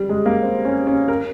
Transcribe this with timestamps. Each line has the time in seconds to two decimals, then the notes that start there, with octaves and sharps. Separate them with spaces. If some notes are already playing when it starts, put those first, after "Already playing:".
Already playing: G3
0.09 G#3
0.26 A#3
0.42 C4
0.65 C#4
0.87 C#4
1.08 A#4